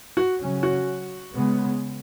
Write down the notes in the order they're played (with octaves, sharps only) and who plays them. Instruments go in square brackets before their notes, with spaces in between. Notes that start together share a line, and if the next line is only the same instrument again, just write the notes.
[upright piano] F#4
[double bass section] C#3 F#3 C#4
[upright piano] F#4
[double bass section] C#3 G#3 B3